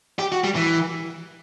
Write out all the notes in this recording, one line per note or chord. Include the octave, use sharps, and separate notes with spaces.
G4
F#4
G3
E3